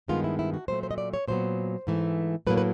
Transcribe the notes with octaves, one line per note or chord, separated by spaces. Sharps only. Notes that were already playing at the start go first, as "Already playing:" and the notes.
G2 D#3 G#3 B3 F4
E4
E4
F#4
A#2 F#3 A3 C5
C5
D#5
D5
C#5
A#2 F#3 B3 C5
G#2 E3 A3
A2 F#3 A#3 B4
B4